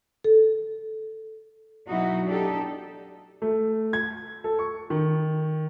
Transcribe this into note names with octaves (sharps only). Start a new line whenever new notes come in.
A4
B2 F#3 D#4 E4 F#4
D4 D#4 G4 A4
A3
G#6
A4
C#6
D#3